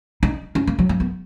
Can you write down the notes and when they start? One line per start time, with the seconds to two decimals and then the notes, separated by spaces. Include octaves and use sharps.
0.23 D#4
0.55 C#4
0.67 A#3
0.79 F#3
0.89 A#3
1.00 B3